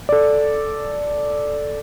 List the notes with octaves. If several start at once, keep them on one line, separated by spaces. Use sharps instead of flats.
A4 D5